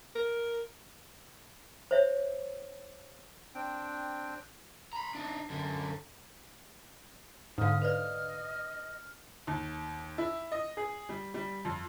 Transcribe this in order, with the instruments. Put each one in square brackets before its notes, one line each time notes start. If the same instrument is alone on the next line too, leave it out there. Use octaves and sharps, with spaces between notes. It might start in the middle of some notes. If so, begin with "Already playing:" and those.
[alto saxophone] A#4
[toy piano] C5 C#5 E5
[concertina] C4 D4 G5
[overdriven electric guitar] A#5 B5
D4 D#4
F#2 D3
[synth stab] G#2 D3 [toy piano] D4 F5 [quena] D#6 [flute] F6
[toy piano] B4 C5 D5 [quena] D#5
[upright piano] D#2
E4
D#5
G#4
G3
G3
F2